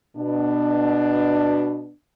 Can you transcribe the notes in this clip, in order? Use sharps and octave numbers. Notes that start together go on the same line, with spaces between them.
B2 D4